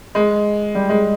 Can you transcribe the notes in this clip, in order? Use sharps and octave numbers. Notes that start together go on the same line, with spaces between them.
G#3
G3
G#3